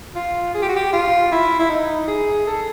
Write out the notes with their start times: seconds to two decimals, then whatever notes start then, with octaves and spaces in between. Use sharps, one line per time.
0.15 F4
0.54 G#4
0.62 G4
0.69 F#4
0.76 G4
0.93 F4
1.32 E4
1.60 E4
1.70 D#4
2.08 G#4
2.47 A4